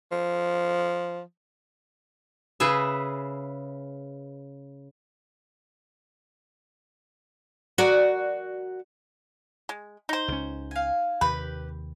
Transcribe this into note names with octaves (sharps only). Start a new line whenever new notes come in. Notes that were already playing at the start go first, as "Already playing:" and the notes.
F3
C#3 G#4 B4 E5
F#4 A#4 D5
G#3
D#4 C5
C#2 C#4
F5 G#5
D#2 C3 G4 B4